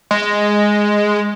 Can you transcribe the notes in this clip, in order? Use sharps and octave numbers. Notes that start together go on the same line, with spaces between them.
G#3